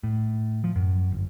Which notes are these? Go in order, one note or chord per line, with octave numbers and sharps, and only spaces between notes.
A2
F3
F#2
G1